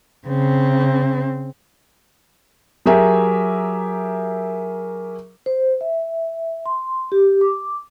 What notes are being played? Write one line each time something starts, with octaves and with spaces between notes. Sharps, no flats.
C#3 C4
F#3 G4 G#4 A#4 E5
C5
E5
C6
G4
D6